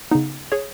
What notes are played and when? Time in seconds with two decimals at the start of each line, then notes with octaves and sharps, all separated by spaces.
0.11 C#3 B3 D#4
0.52 G#4 C#5